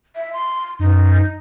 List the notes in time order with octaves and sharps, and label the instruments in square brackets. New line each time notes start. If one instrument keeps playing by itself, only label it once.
[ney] E5
C6
[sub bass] F#2 [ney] D#4